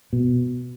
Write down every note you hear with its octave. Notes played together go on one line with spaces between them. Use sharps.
B2